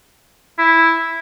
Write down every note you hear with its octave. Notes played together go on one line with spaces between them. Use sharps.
E4